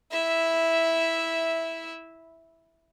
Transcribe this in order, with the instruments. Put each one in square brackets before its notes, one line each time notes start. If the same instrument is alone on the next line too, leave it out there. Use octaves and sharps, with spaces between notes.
[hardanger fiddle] E4 E5